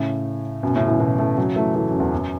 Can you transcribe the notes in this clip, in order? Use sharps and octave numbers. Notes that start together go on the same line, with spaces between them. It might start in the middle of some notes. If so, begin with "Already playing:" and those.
Already playing: A2 C#3
F#2 B2
A2 C#3
B2 E3
B2 E3
E3 A3
C#3 F#3
E3 A3
E3 A3
F#2
E2
F#2